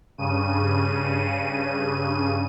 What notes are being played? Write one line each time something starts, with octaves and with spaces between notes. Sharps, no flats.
G2 C#3 D#7